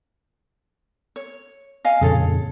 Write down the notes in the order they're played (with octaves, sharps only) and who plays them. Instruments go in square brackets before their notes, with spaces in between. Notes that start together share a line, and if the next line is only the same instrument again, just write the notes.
[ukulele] C#5
D#5 F5 G#5
[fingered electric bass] F2 A#2 C#3 [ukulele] G#4 A4 C#5